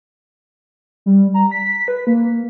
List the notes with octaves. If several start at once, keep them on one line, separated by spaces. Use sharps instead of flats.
G3
A#5
B6
B4
A#3